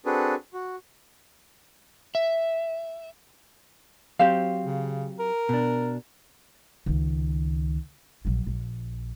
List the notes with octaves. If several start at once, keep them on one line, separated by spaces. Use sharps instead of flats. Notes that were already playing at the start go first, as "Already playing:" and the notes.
C4 D4 F#4 G#4 A4 B4
F#4
E5
F#3 C4 G4 C5 F5
C#3
A#4
B2 D4
C#2 D#3
A#1 F#3
A#1